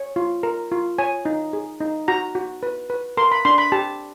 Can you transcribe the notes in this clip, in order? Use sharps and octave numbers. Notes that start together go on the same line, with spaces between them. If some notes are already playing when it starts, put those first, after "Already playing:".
Already playing: C#5
F4
A#4
F4
C#5 G#5
D#4
G#4
D#4
F#4 A#5
F#4
B4
B4
A#4 C6
B5
D4 C6
B5
G4 A5